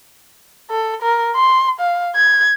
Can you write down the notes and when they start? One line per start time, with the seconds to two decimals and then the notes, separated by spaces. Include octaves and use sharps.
0.71 A4
1.02 A#4
1.36 C6
1.80 F5
2.15 G#6